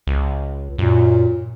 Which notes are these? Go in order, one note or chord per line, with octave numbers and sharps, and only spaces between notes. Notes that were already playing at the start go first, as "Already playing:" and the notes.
C#2
F#2 A#2